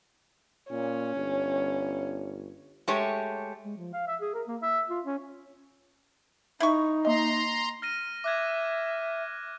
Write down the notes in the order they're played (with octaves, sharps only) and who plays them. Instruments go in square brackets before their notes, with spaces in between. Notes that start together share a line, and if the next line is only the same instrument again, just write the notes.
[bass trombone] A#2 [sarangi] C#4
[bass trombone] G1
[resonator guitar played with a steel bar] G#3 A3 G4 C#5
[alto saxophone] G#3
F3
F5
E5
G#4
A#4
A#3
E5
F4
C#4
[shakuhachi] D#4 [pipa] E4 C#6
[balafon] A#3 D#5 [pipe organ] A#5 C6
[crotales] F6 A#6 D#7
[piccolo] E5 [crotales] D6 F#6 G#6